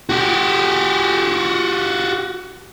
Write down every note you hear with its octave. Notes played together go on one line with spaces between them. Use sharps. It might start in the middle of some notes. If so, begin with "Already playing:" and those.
F#4 G4